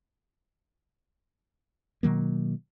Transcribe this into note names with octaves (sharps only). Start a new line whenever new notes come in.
B2 D#3 F#3 A#3